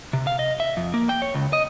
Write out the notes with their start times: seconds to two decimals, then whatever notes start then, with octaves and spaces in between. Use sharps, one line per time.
0.13 C3
0.27 F5
0.39 D#5
0.60 E5
0.77 F2
0.94 A#3
1.09 G5
1.22 C#5
1.34 C#2
1.53 D#5